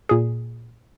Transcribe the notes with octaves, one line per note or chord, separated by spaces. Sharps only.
A#2 G#4